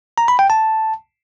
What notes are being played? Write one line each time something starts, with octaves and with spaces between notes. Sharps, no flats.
A#5
B5
G5
A5